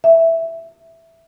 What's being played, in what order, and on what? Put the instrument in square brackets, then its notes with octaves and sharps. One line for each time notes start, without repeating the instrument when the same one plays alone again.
[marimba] E5